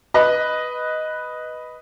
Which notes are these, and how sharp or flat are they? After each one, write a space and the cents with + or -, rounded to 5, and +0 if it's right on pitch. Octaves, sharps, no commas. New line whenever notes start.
B4 +0 D#5 +0